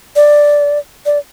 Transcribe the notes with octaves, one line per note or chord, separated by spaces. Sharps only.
D5
D5